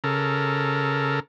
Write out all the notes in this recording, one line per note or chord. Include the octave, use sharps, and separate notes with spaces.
C#3 A4 A#4